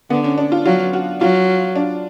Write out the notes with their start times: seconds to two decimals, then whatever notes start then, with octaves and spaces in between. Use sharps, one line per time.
0.10 D3 B3
0.24 C#4
0.38 D4
0.52 F4
0.65 F#3 F4
0.93 F#4
1.21 F#3 F4
1.76 D4